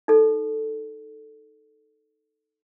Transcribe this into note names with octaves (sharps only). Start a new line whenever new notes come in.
D#4 A4